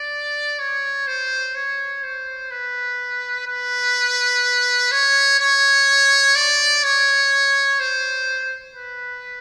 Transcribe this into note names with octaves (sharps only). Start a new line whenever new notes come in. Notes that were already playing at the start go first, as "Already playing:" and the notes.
Already playing: D5
C#5
C5
C#5
C5
B4
B4
C#5
C#5
D5
C#5
C5
B4